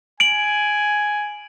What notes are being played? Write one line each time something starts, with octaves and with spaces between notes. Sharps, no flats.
G#5 D7 F#7